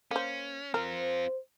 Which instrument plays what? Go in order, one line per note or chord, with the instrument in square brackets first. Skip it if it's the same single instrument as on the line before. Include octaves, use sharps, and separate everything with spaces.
[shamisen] A#3 C5 [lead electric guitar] C#4
[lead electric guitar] C4 F4 [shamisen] A#4 [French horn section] C5